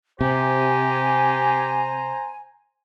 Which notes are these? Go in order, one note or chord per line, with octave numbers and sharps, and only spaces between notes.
C3 G4 C5 G#5 A#5